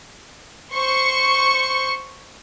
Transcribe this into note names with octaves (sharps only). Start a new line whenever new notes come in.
C5 C#6 C#7